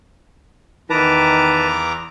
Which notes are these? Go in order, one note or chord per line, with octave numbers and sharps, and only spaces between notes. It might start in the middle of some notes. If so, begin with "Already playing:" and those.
E2 D#3 B4 A5 A#5 D6